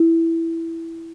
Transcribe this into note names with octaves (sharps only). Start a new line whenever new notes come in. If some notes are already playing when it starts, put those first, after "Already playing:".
Already playing: E4